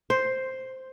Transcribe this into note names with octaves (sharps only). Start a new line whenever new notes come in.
C5